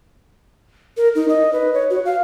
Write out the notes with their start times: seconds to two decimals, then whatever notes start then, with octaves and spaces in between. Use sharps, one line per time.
0.97 A#4
1.15 D#4
1.29 D#5
1.53 B4
1.74 C#5
1.90 F#4
2.05 F5